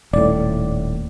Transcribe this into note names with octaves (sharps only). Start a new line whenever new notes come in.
D#1 A2 D5